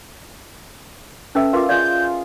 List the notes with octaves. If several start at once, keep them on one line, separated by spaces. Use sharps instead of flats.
C#4 A4 B4 E5 E6
F4 A#4 B4 F5 D6
F4 G#4 D5 D#5 G6